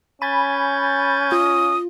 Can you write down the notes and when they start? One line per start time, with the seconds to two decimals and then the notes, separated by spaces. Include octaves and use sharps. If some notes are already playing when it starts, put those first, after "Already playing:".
0.22 C#4 G#5 B5 G6 A6
1.32 F4 D#6